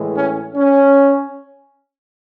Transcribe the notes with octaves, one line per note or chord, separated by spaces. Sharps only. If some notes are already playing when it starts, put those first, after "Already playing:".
Already playing: A2 E3 G#3
C#4
C#4